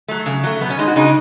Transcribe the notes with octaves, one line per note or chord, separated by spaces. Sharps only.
F#3 A3
C#3
F#3 A3
B2 B3
C#4
G#3 D#4
F#4
C#3 D#4